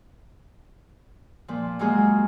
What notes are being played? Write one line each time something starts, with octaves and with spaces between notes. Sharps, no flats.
A#2 F3
F#3 G#3 A#3 F4 F#4 G#4